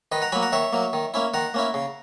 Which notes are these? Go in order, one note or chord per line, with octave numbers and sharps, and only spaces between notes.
D#3 B4 D#5
F#5 A#5
F#3 A#3 G#5 B5
F#5 A#5
D#3 C#5 E5
F#3 A#3
D#3
A#3 C#4 E4
D#3 F#5 A#5
A#3 C#4 E4
C#3